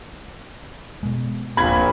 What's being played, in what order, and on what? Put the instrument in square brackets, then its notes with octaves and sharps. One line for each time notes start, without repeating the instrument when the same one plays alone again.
[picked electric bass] B2 G#3
[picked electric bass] D1 C4 [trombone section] A#1 A#2 [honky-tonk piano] B5 G#6